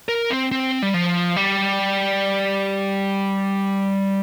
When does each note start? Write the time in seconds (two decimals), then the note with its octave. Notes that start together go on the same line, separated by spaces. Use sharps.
0.09 A#4
0.30 C4
0.52 C4
0.82 G3
0.94 F3
1.36 G3